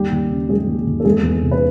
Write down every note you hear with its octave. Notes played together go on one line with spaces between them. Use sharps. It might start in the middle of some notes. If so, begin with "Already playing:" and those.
Already playing: D#2 G3 G4
D#2
C#3
F#3 G#3 G#4
D#2
D#2
A4
E2 G#3 G#4
E2
C3
B4